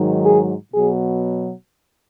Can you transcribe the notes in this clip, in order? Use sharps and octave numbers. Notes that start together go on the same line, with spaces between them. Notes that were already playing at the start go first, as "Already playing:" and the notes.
Already playing: G#2 D#3 F#3
G#4
B2 F#3 G#4